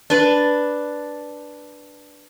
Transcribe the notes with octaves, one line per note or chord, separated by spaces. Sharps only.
D4 B4